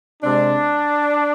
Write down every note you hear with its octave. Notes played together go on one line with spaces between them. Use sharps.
C3 G#3 C4 D4